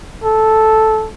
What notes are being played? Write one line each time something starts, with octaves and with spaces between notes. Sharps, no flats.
A4